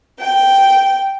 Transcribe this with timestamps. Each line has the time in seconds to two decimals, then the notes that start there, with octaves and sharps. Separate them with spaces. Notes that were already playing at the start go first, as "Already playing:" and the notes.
0.19 G5